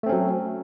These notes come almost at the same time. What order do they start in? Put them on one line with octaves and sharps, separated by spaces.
A3 C4 C#4 F#3